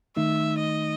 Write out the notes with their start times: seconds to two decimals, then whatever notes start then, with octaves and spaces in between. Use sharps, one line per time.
0.16 D#3 A3 D#4 E5
0.58 D#5